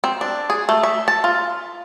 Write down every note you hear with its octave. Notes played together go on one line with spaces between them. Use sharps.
C4
D4
G#4
A3
E5
A5
F4